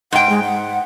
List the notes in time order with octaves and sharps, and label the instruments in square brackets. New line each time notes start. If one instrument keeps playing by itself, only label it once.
[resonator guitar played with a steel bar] G#2 G5 [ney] F#5
[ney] G#3
F#5